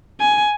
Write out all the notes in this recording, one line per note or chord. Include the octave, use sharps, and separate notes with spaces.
G#5